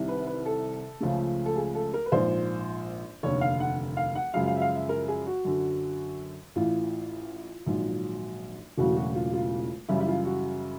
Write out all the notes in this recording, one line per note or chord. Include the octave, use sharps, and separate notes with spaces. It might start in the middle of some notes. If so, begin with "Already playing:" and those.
Already playing: C2 C3 D#3
B4
B4
A4
C#2 C#3 F3 A3
A4
G#4
A4
A#4
B4
A#1 G#2 F3 C5
F1 D#2 D3 C#5
F5
F#5
F5
F#5
F#2 C#3 F3 G#3 F5
F5
E5
F5
E5
A#4
G#4
F#4
F#2 D3 F#3
A1 A2 E3 F4
A#1 G#2 D#3 F#3
E1 E2 C#3 F#3 A3 F#4
F#4
F4
F4
F#2 C#3 E3 G3 E4
E4
F4
F#4